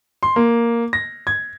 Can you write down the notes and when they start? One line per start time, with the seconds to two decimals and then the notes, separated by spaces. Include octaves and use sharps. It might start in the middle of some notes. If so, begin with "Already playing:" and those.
0.23 C6
0.36 A#3
0.93 A#6
1.27 G#6